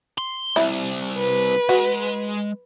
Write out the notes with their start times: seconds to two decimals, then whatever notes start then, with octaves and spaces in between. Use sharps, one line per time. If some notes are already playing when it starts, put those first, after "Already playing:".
0.18 C6
0.56 C2 E4
1.17 B4
1.69 G#3 F#4